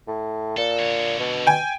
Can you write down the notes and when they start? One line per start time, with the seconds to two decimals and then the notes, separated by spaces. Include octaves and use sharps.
0.07 A2
0.57 A#2 A4
0.79 D3 C#5
1.19 B2
1.47 G5 G#5